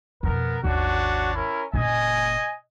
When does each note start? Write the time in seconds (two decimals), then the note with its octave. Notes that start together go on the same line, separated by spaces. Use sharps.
0.23 F2 B2 B3 A#4
0.64 G#1 D#2 D4 F#4 C#5
1.34 C#4 E4 A#4
1.73 F#1 A#2 D#5 G#5